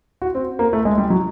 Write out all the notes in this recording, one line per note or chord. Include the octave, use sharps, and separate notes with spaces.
F#4
C4
A#3
A3
G#3
G3
F#3